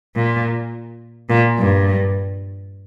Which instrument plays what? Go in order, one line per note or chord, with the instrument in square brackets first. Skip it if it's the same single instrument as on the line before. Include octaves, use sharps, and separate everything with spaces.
[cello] A#2
A#2
G2